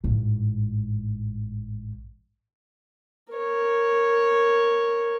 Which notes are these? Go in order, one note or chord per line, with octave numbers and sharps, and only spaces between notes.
A1 G#2
A#4 C#5